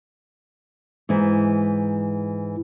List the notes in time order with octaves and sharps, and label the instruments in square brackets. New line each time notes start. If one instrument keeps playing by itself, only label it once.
[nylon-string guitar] G#2 E3